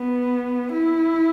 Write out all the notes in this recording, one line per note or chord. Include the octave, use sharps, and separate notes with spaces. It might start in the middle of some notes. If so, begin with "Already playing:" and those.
Already playing: B3
E4